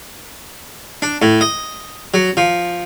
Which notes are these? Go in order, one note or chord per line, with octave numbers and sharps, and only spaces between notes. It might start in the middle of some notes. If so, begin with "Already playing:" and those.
D4
A2
D#5
F#3
F3